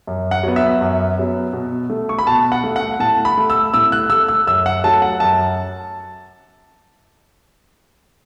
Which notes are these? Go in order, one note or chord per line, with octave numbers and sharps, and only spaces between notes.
F#2
F#5
F#3 B3
E5
F#2
F#3 B3
B2
A3
C#6
B5
B2 A5
F#5
A3
F#5
A2 A5
B5
A3
E6
A2 E6
F#6
A3 E6
E6
F#2 E6
F#5
F#3 A3 A5
F#5
F#2 A5